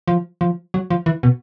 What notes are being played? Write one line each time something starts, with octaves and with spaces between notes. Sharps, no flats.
F3
F3
F#3
F3
E3
B2